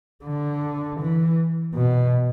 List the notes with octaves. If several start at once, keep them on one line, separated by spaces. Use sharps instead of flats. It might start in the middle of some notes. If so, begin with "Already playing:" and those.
D3
E3
B2